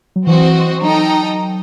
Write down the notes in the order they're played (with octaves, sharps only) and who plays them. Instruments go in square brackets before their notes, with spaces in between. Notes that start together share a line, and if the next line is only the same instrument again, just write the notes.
[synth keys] F#3
[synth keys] E3 [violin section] C4 F#4 C5 D#5
[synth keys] F#3 [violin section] D#4 A4 D#5 G5